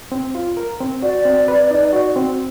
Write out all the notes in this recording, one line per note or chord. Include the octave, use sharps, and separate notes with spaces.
C4
F4
A#4
C4
F#4 D5
C4
B4
D#4
F#4
C4